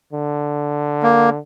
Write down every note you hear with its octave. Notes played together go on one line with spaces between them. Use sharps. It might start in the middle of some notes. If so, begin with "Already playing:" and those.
D3
A#3